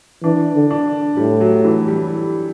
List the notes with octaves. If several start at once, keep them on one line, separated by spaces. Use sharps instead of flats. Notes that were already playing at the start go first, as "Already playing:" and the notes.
E3 D4
D3
D4
A2 G3
F#3
E3
G3